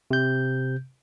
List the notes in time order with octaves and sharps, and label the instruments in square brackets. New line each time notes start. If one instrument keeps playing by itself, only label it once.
[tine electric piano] C3 G6